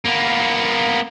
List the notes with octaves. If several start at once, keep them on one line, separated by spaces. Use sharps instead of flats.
A#3 B3